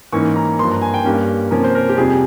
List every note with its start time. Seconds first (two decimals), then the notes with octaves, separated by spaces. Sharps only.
0.13 G#2 E3 A#3 C#4 C#6
0.36 A#5
0.59 G2 F3 A#3 C6
0.71 A#5
0.82 G#5
0.94 G5
1.04 G2 G3 A#3 C#4
1.51 C3 F3 A#3 C#4 A#4
1.64 C5
1.75 A#4
1.89 G4
1.97 F2 C3 G3 G#4